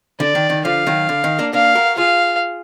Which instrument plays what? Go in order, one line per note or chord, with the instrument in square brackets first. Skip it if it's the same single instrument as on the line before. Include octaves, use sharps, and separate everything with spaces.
[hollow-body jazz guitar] D3 [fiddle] D5
[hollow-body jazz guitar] D#3
D#3
[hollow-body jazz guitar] D3 F3 [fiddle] F5
[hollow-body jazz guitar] D#3 F#3
D3
D#3
A#3 D4
[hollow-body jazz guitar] A#3 D4 [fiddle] F5
[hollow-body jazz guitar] F#4 A#4
[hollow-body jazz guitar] F4 G#4 [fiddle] F5